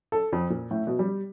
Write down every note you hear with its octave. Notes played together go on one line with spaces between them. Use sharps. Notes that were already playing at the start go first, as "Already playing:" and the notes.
A4
F2
A#2
A2
B2
G3